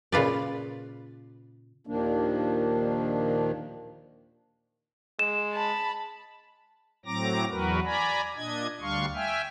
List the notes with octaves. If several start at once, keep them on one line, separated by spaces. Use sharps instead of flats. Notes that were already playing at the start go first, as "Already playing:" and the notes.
A#2 C#3 F4 B4 D5
D#2 A#2 D#3 F3 A#3 D4
G#3 E7
A5 B5
A2 F#3 C4 A#5 D6 A#6
E2 F#3 F#4 A#4 B4
D5 G#5 A#5 B5
A#2 D4 D#5 G#6
D2 G3 D4 F5 C6 C#6
E5 G5 G#5 F6